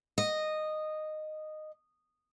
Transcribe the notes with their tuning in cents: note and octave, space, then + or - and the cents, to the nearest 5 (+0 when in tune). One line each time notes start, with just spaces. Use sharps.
D#5 -10